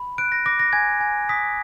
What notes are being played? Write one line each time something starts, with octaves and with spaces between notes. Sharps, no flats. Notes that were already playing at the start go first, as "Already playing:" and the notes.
Already playing: B5
F#6 D7
A#6
D6 A#6
A#6
G#5 G#6
G#5
D#6 B6